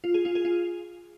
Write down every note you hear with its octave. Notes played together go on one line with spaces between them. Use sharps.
F4
G#4
F4
G#4
F4